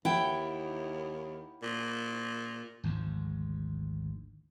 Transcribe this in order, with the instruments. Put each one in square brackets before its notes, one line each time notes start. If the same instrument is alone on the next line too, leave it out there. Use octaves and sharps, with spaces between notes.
[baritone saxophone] D#2 [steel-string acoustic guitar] E4 F#5 G5
[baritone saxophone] A#2
[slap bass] G#1 D2 G#2 F3